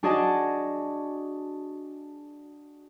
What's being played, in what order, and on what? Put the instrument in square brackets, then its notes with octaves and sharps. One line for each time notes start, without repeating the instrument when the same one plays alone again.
[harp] D4 F#4 G#4 D5 D#5 A5